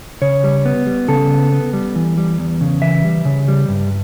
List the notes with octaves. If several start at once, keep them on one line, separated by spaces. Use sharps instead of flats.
C#3 C#5
G3
B3
G3
C#3 A4
B3
B3
G3
E3
G3
E2
C#3
E3 E5
G3
C#3
G3
G2